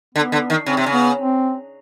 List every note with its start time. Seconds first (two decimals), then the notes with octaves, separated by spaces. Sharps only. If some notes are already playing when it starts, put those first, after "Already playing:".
0.15 D3 B3
0.32 D3
0.50 D#3
0.66 C#3 C4
0.77 C3
0.86 C#3
0.93 B3
1.19 C4